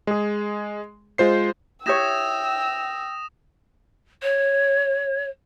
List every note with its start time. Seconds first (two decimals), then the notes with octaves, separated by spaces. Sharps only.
0.07 G#3 G#4
1.18 G#3 F4 C5 C7
1.86 E4 G4 C#5 G5 D#6 E6 A#6 E7
4.23 C#5